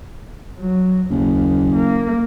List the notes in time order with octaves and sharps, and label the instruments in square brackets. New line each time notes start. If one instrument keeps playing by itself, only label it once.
[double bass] F#3
[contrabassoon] F#1 [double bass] D#2
[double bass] A#3